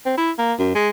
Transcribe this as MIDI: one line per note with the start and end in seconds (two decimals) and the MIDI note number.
0.06 0.13 60
0.17 0.31 64
0.38 0.53 58
0.59 0.75 42
0.75 0.89 56